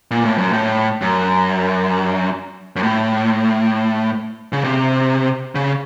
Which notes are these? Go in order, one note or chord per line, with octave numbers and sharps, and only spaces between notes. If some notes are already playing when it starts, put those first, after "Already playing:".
A#2
A2
F#2
A2
F#2
F#2
A2
C#3
C3
C#3